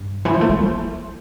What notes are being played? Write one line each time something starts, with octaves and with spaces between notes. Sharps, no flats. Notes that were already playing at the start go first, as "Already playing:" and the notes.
Already playing: G2
E3
F3
A3
G3